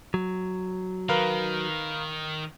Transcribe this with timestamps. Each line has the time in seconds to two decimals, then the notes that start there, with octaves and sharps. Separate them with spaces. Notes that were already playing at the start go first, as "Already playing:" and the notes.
0.14 F#3
1.09 D#3 A#4 B4 F5